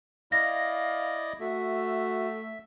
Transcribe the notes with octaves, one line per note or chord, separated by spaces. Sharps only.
E4 D5 D#5 F5 A#6
A3 F#4 E5